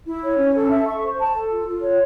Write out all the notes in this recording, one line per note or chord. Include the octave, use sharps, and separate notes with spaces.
E4
C#5
C#4
A4
E5
C#6
C5
A5
A4
F4
F4
C#5